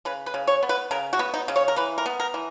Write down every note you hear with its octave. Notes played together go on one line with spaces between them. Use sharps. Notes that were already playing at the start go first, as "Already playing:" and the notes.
C#3 B4
B4
C#3
C#5
B3
B4
C#3 A#4
F#4
B3
D#4
C#3
C#5
A#4
E3 B4
A#4
B3
A#4
E3